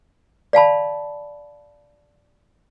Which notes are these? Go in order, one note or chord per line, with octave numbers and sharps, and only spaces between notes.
D5 F5 A5 B5